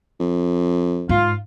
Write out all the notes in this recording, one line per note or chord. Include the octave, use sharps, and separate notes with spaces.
F2
G#2 F4